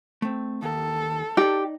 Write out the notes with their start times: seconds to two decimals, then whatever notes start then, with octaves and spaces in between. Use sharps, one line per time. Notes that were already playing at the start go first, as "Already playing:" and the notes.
0.22 A3 C4
0.63 D#2 A4
1.37 D#4 G4 D5